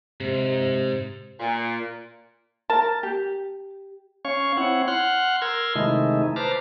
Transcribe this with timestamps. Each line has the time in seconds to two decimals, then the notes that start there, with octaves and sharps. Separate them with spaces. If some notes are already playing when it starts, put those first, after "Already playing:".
0.21 G#2 C3
1.40 A#2
2.70 A#4 A5
3.03 G4
4.25 C#4 C#5 F5 C#6
4.57 C4 E4 C#5 F#5
4.88 F#5 C6 F6 F#6
5.42 A#4 C6 E6 F6 G#6
5.75 C3 D#3 G#3 A3 D#4 E4
6.36 B4 C5 A5 A#5 D6 F6